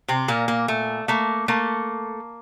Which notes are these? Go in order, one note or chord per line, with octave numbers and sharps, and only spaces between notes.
C3 C4
A#2 A#3
A#3
A3
A3 A#3
A3 A#3